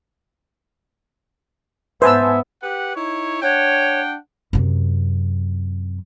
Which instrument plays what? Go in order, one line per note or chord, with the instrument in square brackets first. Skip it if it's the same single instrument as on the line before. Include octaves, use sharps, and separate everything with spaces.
[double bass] G#2 B3 [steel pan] B4 E6 [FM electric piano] C5 G#5 A5 [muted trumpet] E5
[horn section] G4 B4 F#5
D#4 E4 C#5
[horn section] D4 F#5 G5 [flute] C#5
[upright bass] F#2 C3